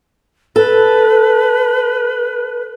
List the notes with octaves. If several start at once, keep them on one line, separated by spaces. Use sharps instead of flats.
A4 B4